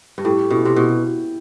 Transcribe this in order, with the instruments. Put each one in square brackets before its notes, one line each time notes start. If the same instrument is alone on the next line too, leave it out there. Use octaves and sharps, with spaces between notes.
[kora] G2
[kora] A2 [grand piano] G4
[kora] B2 [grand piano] E4
[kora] C3
[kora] B2 [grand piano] E4